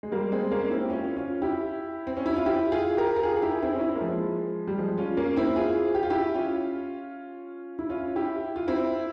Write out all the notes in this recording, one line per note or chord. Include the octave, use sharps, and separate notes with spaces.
G#3
G3 A#3
G#3 C4
A#3 C#4
C4 E4
G4
C#4 F4
C#4 F4
E4 G4
C4
C#4
E4
F4
E4 G4
F4 G#4
G4 A#4
A#4
F4 G#4
G#4
E4 G4
C4 E4
C#4
C4 E4
A#3
F3 G#3
G3
F3 G#3
C#4 F4
A#3 C#4
C4 E4
F4 G#4
G4
F4
E4 G4
C#4 F4
E4
C#4 F4
E4 G4
F4
C4 E4